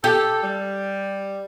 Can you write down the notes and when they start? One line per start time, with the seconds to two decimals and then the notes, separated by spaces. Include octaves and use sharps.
0.04 G4 A4
0.43 G3